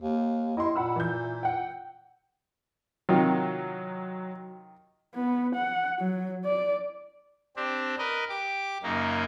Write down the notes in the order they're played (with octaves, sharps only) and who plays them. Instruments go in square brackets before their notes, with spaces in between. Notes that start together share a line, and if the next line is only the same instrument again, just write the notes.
[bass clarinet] D#2
[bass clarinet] E4 [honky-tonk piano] D#5 C6
[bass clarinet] A#2 [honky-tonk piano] F#5 B5 E6
[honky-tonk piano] E3 G6
F#5 G5
[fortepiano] C3 D#3 F4 [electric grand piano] F#3
[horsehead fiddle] B3
F#5
F#3
D5
[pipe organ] C4 D4 G4
A#4 B4 D#5
G4 D6
F#2 C#3 A#3 D#4